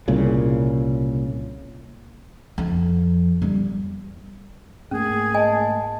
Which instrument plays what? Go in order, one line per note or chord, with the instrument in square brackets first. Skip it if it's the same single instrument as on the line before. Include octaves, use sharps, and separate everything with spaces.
[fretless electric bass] C2 A#2 C#3
[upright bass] F2
G3
[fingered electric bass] G#2 A3 A#3 [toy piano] C#4 [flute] G#4
[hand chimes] D#5 A5 [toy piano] G#5